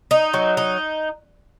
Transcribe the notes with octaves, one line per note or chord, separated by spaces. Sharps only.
D#4
F#3
D#4